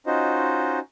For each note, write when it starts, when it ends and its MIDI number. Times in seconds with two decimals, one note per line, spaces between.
0.06 0.79 61
0.06 0.79 63
0.06 0.79 65
0.06 0.79 66
0.06 0.79 72
0.06 0.79 75